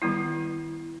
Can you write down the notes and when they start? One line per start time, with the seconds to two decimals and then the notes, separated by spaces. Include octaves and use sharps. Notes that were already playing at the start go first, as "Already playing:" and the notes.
0.02 D#3 G3 B3 E4